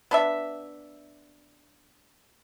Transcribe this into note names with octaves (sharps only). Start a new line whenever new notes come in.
B3 D4 E5